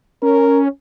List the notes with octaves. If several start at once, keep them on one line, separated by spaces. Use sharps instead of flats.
C#4 A#4